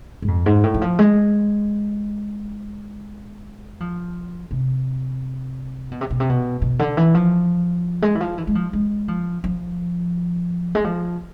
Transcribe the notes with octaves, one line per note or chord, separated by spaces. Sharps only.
G#2
F2
G#2
A2
E3
F3
G#3
F3
C3
B2
C3
B2
C3
B2
B2
D3
E3
F3
G#3
E3
F3
E3
G#3
F3
G#3
F3
F3
G#3
F3